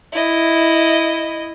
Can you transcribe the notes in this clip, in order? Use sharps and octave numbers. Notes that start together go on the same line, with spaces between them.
E4 D#5